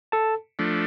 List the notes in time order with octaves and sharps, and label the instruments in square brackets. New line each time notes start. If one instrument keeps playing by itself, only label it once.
[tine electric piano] A4 A5
[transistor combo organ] F3 A3 D4